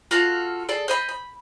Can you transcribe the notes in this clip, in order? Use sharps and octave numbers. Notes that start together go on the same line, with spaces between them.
F4 F#4 A4 F5
G#4 A4 D5
C5 D#5 B5
B5